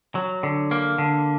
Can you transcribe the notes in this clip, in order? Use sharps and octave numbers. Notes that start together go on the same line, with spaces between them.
F#3
D3
A#3
D3